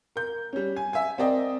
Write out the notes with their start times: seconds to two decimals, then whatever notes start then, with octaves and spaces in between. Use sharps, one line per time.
0.16 A#4 G6
0.53 G3 C#4
0.76 G#5
0.93 E5 G#5
1.18 C4 A#4 D5 D#5 G5